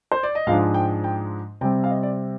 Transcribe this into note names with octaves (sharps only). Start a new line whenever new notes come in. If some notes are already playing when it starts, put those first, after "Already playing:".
C5
D5
D#5
G#2 F3 G#3 D4 F5
G5
G5
C3 G3 C4 G5
F5
D#5
D5